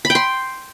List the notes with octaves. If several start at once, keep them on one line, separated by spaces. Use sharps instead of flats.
B5
G5
C6